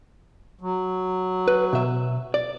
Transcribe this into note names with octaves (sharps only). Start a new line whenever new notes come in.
F#3
B4
B2 E5
D5